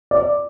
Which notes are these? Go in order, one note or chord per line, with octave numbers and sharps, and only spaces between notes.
D5